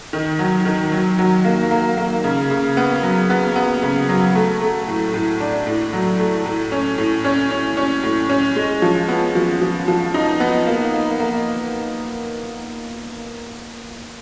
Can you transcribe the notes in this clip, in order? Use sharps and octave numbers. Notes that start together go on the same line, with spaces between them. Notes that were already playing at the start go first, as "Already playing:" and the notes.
D#3
F#3
D#3
F#3
F#3
A#3
A#3
A#3
C#3
C#3
B3
F#3
B3
B3
C#3
F#3
A3
A3
A2
A2
D4
A2
F#3
A3
A2
C#4
A2
C#4
C#4
C#4
A2
C#4
G#3
F3
B3
F3
F3
F3
D#4
B3
A#3
A#3
A#3